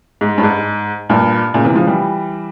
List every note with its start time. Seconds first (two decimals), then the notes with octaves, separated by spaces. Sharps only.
0.21 G#2
0.38 G2
0.43 G#2
1.09 G2 A#2
1.54 A#2 C#3
1.65 C3 E3
1.75 C#3 F3
1.87 E3 G3